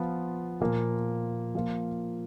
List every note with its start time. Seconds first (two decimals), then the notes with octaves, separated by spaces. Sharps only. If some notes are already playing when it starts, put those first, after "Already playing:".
Already playing: F3 B3 F4
0.61 A#2 F3 A#3
1.55 F3 A#3 F4